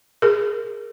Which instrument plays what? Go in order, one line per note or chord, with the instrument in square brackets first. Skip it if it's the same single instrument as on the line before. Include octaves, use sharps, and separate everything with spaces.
[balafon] G#4 A#4